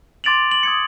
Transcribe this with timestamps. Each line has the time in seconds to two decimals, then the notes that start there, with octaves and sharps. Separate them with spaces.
0.24 C6 D6 A6 D7 F7 F#7
0.51 F#7
0.63 D#6 G#6 C#7